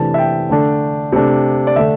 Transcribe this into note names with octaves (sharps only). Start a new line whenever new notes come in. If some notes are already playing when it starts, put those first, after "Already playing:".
Already playing: C3 E3 A3 D4 A5
E5
G5
D3 A3 D4
C3 A3 D4
D5
D3 A3 D4 E5